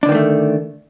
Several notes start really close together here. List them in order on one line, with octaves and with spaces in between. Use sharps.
D4 D3 D#3 A#3 A3